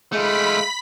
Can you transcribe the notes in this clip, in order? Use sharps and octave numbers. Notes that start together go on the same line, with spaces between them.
G#3 A3 F4 B5 B6